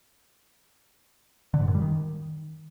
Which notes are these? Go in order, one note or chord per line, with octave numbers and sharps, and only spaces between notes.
D3
G#2
F#2
G3
D#3